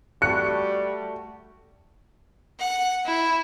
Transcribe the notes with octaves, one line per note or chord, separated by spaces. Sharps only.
G3 A3 F#4 F#6 C#7
F#5
E4